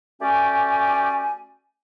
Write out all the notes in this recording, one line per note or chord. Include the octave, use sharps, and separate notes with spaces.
A3 C#4 F#4 G4 D5 G#5